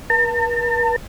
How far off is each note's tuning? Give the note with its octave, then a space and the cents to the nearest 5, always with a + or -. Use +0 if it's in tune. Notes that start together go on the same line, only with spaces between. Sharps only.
A#4 +45 A5 +45